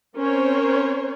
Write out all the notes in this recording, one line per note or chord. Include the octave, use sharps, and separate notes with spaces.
C4 C#4 A#4 C5 C#5